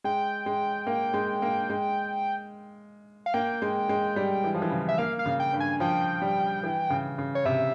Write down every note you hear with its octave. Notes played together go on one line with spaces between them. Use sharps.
G#3 G5
G#3
A#3
G#3
A#3
G#3
F5
A#3 G5
G#3
G#3
G3
E3
F3
E3
C#3
E5
A#3 F5
F5
C#3
G5
G2
G#5
F3 G5
G3
E3
C#3
C#3
C#5
C3 E5